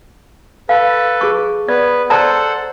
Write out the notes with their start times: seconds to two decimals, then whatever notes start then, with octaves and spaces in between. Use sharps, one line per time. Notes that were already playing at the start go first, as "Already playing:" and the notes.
0.69 A4 B4 F5
1.21 G#4 C#6
1.68 B3 B4 D5
2.10 A4 C5 D5 F#5 A5 A#5